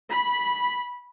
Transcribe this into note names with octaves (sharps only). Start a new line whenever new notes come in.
B5